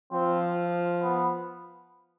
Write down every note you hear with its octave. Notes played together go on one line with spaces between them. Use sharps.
F3 C4
B3